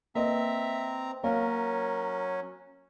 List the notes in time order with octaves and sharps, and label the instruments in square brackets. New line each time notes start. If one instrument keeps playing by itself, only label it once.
[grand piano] A#3 B4 D#5 [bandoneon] C4 A#5 [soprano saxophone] E5
[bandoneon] F#3 C#4 [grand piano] A#3 C#5 F5 [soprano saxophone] A#4